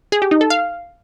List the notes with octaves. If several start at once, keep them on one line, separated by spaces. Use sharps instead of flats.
G#4
G4
D#4
A4
F5